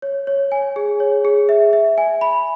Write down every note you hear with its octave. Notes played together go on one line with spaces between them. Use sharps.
C#5
C#5
G#5
G#4
C#5
G#4
E5
E5
G#5
B5